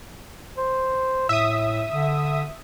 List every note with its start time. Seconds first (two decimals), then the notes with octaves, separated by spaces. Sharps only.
0.57 C5
1.29 A2 E5 D#6
1.90 D3